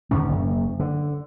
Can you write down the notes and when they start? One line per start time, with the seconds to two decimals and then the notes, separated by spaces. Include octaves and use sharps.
0.11 E2 D3 D#3 C#4
0.29 F#1
0.80 D3